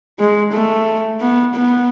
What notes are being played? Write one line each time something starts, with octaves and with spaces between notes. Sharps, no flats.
G#3
A3
B3
B3